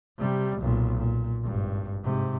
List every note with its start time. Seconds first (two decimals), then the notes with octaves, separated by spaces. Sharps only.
0.18 C3 G3
0.59 B1 A#2
0.98 A#2
1.44 G#1 G2
2.04 G#2 C3